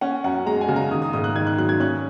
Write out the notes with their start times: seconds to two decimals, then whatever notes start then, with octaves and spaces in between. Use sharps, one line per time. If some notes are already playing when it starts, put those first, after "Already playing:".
0.01 C#4 F#5
0.24 F#2 F#5
0.46 G#3 A#5
0.61 G#5
0.68 C#3
0.76 A#5
0.91 D#3 D#6
1.02 D#6
1.13 G#2 D#6
1.24 F#6
1.36 D#3 G#6
1.47 F#6
1.58 F#3 F#6
1.69 G#6
1.80 C#4 F#6